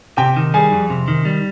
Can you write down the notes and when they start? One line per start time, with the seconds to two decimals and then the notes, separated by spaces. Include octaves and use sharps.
0.17 C3 G4 G5
0.36 D#3
0.54 G3 G#4 G#5
0.72 F2
0.90 C3
1.08 D#3
1.25 G3